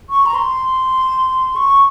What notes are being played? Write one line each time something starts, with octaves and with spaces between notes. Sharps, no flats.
C#6
A#5
C6
C#6